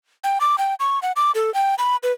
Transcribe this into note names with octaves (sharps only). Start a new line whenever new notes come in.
G5
D6
G5
C#6
F#5
D6
A4
G5
B5
B4